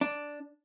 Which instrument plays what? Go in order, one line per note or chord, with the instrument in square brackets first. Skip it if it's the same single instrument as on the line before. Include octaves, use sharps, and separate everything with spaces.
[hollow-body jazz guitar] D4